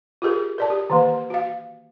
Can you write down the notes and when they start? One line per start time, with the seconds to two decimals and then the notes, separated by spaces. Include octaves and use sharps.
0.22 F4 G4 G#4 A#4
0.58 A#4 D5 A5
0.70 G4
0.90 D#3 E3 A#3
1.30 F#4 F5